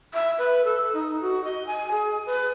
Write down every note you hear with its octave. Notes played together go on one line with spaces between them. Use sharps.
E5
B4
A4
D#4
F#4
D#5
G#5
G#4
B4